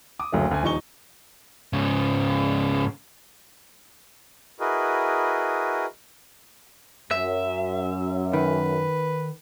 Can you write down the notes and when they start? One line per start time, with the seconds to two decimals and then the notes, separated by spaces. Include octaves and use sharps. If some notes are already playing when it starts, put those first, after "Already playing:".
0.19 D6 D#6
0.32 F#1 D2 F#3 A3
0.51 D2 G#5
0.62 D#1 F3 D#4 C#6 G7
1.73 G#2 C#3
4.60 E4 F#4 G#4 A#4 B4 D#5
7.11 F#2 E5
8.33 D#3 B4